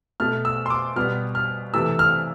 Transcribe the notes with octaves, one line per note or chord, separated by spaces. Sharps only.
B2 A3 F6
E6
C6
D6
B2 G3 B3 F6
F6
C3 E3 A3 E6
F6